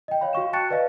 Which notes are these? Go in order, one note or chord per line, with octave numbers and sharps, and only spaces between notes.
D#5 G5
C#5 F5 B5
F#4 F5 C#6 E7
G5 A5 C#6 F#6 A6 C#7
B4 D5 D#5 F5 A5